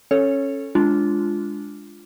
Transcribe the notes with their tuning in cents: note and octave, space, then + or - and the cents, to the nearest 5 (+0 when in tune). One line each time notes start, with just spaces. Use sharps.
C#4 -15 A4 +0 C#5 +0
G#3 +0 D4 -5 F4 -5